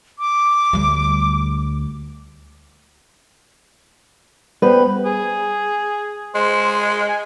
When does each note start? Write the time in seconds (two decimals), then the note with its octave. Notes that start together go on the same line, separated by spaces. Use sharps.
0.19 D6
0.73 D2 G3
4.62 G3 B3 G4 B4 C5
5.05 G#4
6.35 G#3 C5
7.08 G#5